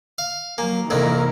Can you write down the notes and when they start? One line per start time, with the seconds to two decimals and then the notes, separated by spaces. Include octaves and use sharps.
0.18 F5
0.58 F#3 A#3 G#5
0.90 A#1 F2 C3 D#3 E3 C4 E4 A#4